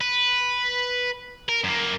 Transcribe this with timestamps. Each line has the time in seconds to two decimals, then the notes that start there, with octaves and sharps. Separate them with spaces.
0.01 B4
1.49 A#4
1.64 F#2 A#3